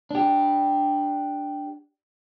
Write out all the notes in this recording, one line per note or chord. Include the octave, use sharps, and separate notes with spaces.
D4 G4